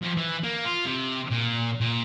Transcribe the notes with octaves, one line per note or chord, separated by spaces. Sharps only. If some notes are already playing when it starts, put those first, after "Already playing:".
F2
E3
A#3
F4
C3
A#2
A#2